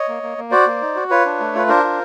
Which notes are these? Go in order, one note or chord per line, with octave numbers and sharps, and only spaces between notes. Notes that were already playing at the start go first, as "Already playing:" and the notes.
Already playing: C#5 D#5
A#3
A#3
A#3
F#4 C5 D5
A#3
D#4
F#4
F4 B4 C#5
D4
A3
F4 B4
D4 A#4 C5
F4